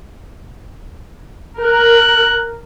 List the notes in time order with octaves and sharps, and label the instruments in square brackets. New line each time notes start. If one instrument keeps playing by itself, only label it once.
[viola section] A#4 [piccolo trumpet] F#6